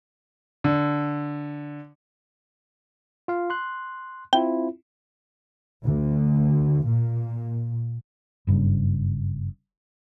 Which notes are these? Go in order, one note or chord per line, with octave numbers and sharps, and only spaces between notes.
D3
F4 F5
C6 F#6
C4 E4 F4 G5
D2
A#2
F#1 G2 C#3